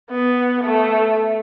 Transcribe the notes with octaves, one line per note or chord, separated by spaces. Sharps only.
B3
A3